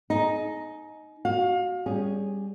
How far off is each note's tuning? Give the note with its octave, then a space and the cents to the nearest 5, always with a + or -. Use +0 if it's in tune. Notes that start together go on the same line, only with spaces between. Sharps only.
D#4 +0 G#4 +35
F#4 +0 F5 +30
G3 +15 C#4 +0 G#4 +0